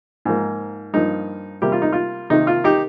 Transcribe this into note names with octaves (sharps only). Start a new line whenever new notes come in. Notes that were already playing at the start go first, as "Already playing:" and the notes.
G#2 F3 A#3
G2 F3 A#3 D#4
C3 G3 A#3 G4
F4
D#4
F4
C3 D#3 A#3 D#4
F4
D#4 G4